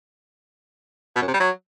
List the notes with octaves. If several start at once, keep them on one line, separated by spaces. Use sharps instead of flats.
B2
F#2
C3
G3
F#3